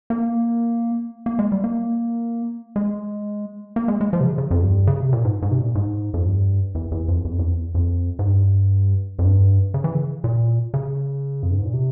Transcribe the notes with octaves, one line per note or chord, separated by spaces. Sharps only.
A#3
A#3
G#3
G3
A#3
G#3
A#3
G#3
G#3
F3
C3
C#3
C#3
F2
G2
C#3
C3
A#2
G#2
G#2
C3
A#2
G#2
F2
G2
E2
E2
F2
E2
F2
E2
F2
E2
F2
G#2
G2
F2
G2
C#3
E3
C#3
A#2
C#3
F2
G2
G#2
A#2
C3